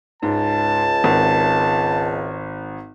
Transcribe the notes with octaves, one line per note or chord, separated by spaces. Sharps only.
C#2 G#2 A5
G#1 A#4